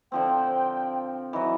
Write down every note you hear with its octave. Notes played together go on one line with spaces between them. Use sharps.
D3 F3 C4 G5
E3 F#3 D#5